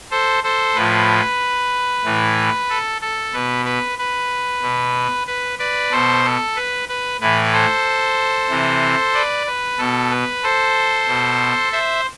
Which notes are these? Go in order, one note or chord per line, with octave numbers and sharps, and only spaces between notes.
A4 C5
A4 C5
A2 F3 B4
A2 E3
A4
A4
B2 B4
B4
B4
B2
B4
B4 D5
B2 A4 C5
A4
B4
B4
A2 E3 B4
A4 C5
C3 E3
B4 D5
B4
B2 A4
B4
A4 C5
B2
C5 E5